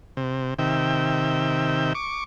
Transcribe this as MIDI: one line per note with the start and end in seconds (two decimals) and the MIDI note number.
0.17 0.54 48
0.59 1.93 48
0.59 1.93 51
0.59 1.93 76
0.59 1.93 79
1.95 2.24 85
1.95 2.24 86